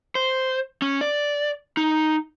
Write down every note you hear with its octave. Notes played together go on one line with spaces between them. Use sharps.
C5
C#4
D5
D#4